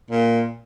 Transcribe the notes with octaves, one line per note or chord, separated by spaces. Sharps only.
A#2